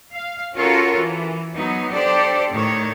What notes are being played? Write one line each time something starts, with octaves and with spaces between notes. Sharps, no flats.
F5
C#4 F4 F#4 A4 A#4 C#5
E3
F#3 B3 D#4
D4 G4 A4 C5 D5
A2 D#3 C#5